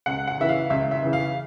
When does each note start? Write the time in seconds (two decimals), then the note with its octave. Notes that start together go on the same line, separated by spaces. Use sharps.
0.06 C#2 F#5
0.27 F#5
0.38 C#3 E3 E5
0.49 F5
0.70 C#2 E5
0.91 E5
1.02 C#3 E3
1.13 F5